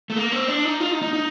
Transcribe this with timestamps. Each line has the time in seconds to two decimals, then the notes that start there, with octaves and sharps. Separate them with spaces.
0.10 A3
0.16 A#3
0.32 C4
0.48 D4
0.65 D#4
0.80 F4
0.91 D#4
1.02 D#4
1.13 D#4